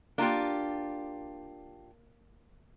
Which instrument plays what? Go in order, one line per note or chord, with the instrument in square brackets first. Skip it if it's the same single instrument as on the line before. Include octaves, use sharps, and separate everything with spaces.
[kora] A#3 A#4 [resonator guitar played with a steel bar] D4 F4 G4